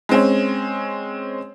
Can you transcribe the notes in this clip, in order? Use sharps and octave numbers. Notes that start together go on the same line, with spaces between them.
G#3 C4 C#4